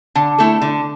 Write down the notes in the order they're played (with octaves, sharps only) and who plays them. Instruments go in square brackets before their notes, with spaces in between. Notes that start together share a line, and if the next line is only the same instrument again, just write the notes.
[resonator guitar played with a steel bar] D3 [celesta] A5
[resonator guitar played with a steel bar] A3 E4 A4
D3